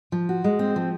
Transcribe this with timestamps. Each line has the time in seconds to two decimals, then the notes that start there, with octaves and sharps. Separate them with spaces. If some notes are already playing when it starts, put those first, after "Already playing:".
0.12 F3
0.29 F#4
0.44 G#3
0.59 C4
0.76 F3